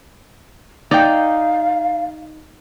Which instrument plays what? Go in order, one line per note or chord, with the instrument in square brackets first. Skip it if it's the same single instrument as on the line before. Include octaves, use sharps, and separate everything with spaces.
[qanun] D#4 [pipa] D5 G5 [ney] F5